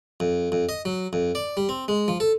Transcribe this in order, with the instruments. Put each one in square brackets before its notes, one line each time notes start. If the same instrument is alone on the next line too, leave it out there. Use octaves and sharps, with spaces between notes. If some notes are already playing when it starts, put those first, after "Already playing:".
[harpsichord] F2
F2
D#5
F#3
F2
D5
G3
C4
G#3
F3
A4